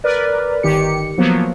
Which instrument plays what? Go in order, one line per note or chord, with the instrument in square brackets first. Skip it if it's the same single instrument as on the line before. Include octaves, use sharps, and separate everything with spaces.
[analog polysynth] A#4 B4 D5
G1 D#3 G4 C#7
F3 F#3 A#3 B3